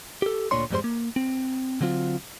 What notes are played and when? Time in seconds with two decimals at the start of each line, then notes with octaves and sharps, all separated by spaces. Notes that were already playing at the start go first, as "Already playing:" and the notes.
0.22 G4 A4
0.51 D2 A#2 D3 D4 C#5 C6
0.71 F2 G#2 G3 G#3 C5 C6
0.84 A#3
1.16 C4
1.81 D3 F#3 C4 F4